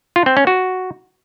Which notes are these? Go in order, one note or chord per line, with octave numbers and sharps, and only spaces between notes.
F4
C4
C#4
F#4